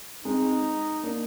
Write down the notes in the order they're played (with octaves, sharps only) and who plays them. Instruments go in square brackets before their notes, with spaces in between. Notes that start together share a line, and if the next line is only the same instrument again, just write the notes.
[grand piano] G#3 C4 [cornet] D#4
[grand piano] A#3 D4